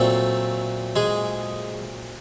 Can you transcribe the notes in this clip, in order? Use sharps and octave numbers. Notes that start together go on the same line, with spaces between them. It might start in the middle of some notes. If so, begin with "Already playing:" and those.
Already playing: A#2 F#3 A3 C4 A4
G#3 G#4